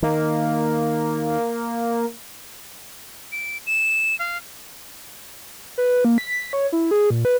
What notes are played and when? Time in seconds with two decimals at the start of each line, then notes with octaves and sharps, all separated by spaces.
0.02 D#3 A#3
3.32 D7
3.67 E7
4.19 F5
5.78 B4
6.05 A#3
6.18 B6
6.53 C#5
6.72 E4
6.91 G#4
7.10 A#2
7.25 B4